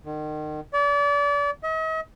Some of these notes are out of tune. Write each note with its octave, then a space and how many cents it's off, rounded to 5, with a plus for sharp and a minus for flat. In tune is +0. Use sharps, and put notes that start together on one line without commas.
D#3 -35
D5 -35
D#5 +45